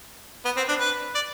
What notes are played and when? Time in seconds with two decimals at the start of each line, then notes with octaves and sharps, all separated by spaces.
0.45 B3
0.57 C4
0.69 D4
0.80 B4
1.15 D5